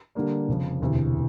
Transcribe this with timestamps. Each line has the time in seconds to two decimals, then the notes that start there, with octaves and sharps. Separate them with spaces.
0.15 D3 G3 A#3 D4
0.48 F1 F2 C#3
0.81 E1 D2 C3 E3